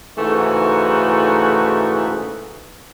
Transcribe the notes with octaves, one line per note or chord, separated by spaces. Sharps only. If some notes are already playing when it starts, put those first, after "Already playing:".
G#2 C#3 E3 A3 D#4 F#4